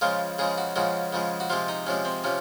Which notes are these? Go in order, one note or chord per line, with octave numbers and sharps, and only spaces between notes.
C#3 F3 G#3 F4
C#3 F3 G#3 G#4
F#4
C#3 F3 G#3 F#4
C#3 F3 G#3
F#4
C3 F3 G#3 F4
D#4
C3 F3 G#3 C#4
C4
C3 F3 C#4